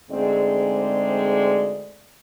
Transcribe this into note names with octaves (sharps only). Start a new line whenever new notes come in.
D2 G#2 G#3 C4 D5